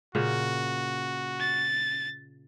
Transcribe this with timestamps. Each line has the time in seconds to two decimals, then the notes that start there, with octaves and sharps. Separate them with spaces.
0.15 A#2 C#3 F#4
1.40 A6